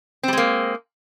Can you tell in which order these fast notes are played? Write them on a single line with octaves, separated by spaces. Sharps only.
C4 G3 G#3 A#3